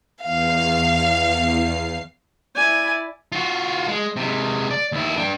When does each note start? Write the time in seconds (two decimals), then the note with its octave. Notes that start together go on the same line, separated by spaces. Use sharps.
0.22 E2 F5 C7
2.56 E4 D5 G#5
3.32 F4 F#4
3.88 G#3
4.16 C3 G#3
4.71 D5
4.92 D#2 E4
5.17 D4 G5